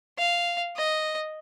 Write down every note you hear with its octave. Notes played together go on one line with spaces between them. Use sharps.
F5
D#5